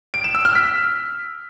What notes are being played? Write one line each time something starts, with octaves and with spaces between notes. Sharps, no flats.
D7
E7
E6
F6
B6